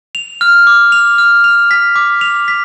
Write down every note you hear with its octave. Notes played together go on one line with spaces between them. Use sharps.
F7
F6
D6
F7
F6
F7
B6
D6
F7
B6